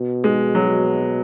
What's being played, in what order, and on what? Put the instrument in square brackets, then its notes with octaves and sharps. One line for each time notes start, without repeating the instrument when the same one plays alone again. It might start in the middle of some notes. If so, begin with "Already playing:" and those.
Already playing: [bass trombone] B2
[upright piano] G#3
F#3